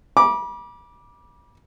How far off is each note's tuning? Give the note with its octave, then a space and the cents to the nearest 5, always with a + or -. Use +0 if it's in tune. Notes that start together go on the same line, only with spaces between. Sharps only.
B5 -40 D6 +0